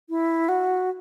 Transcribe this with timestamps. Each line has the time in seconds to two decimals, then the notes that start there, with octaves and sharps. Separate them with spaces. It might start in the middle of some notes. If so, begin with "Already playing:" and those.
0.10 E4
0.49 F#4